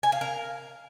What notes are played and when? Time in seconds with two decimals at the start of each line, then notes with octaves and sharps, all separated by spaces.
0.03 G#5
0.12 F5
0.21 A#4